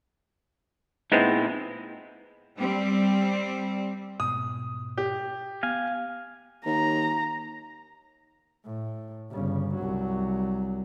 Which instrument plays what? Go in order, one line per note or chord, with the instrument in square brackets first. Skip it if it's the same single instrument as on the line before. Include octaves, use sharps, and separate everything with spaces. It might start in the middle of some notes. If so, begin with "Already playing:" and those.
[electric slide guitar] A#2 D#4 E4 [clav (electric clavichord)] G#3 B3 C4
[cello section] G3 C4
[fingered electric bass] G#2 B2 [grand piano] D#6
[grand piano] G4
[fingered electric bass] B3 [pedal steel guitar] F5 G#5
[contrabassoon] D#2 [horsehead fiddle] A#5
[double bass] A2
G1 C#3
C2 F#3